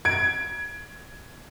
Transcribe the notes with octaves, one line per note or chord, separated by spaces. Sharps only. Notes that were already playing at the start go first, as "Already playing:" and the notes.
G#6 D7